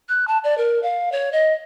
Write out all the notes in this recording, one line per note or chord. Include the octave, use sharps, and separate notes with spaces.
F#6
A5
D5
A#4
F5
C#5
D#5